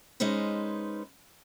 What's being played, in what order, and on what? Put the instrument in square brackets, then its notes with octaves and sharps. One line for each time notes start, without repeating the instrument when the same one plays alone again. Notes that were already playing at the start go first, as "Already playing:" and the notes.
[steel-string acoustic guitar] G#3 C#4 D#4 B4 C5